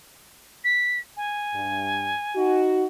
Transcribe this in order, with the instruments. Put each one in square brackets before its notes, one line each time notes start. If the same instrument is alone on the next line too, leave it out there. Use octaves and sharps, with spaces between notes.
[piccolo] B6
G#5
[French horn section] G2
D#4 F#4